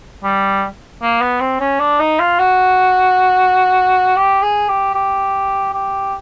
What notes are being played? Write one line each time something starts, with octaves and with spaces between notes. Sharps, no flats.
G3
A#3
B3
C4
C#4
D4
D#4
F4
F#4
G4
G#4
G4
G4
G4